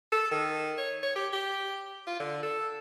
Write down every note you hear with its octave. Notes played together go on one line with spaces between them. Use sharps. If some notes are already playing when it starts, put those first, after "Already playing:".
A4
D#3
C#5
C#5
G4
G4
F4
D3
A4